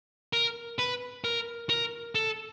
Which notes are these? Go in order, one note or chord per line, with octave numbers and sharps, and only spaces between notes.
A#4
B4
A#4
A#4
A4